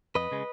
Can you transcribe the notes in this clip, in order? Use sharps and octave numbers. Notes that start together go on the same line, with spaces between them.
F2 B4 D#5
C#3 G#3